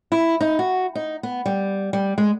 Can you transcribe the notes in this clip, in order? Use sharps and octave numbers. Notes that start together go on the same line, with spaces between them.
E4
D#4
F#4
D#4
B3
G3
G3
G#3